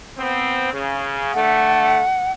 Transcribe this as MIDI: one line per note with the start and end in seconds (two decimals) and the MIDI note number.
0.18 0.71 59
0.18 0.71 60
0.72 1.33 49
1.34 2.00 50
1.34 2.00 57
1.34 2.32 78